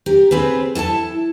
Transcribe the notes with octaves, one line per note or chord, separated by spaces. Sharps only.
G4 A#4
C4 G#4 B4
E4 A4 G5 A5